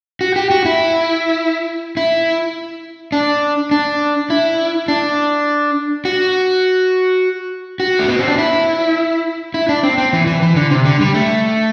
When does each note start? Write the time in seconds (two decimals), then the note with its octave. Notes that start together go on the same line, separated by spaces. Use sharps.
0.21 F#4
0.36 G4
0.51 F#4
0.65 E4
1.97 E4
3.12 D4
3.71 D4
4.30 E4
4.88 D4
6.05 F#4
7.80 F#4
7.99 A3
8.08 B3
8.19 C4
8.28 D4
8.38 E4
9.54 E4
9.69 D4
9.83 C4
9.98 C4
10.13 E3
10.27 E3
10.42 E3
10.56 D3
10.70 C3
10.86 D3
11.00 G3
11.14 A3